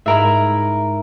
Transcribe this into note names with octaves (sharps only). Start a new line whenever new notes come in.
G#2 E4 G4 A#4 E5